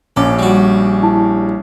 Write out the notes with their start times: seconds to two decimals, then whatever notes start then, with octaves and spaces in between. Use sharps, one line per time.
0.16 A#1 C#4 A4 D6
0.39 G3 F#4
1.03 E4 A5